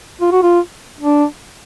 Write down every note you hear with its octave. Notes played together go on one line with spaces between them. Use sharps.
F4
F#4
F4
D4